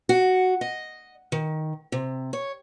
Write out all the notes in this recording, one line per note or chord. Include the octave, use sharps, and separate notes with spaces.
F#4
D#5
D#3
C3
C#5